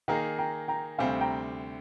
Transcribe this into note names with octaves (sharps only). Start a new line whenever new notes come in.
D#3 A#3 D#4 G#4 G5 A#5
G5 A#5
G5 A#5
D2 C3 G3 C4 F5 G#5
G5 A#5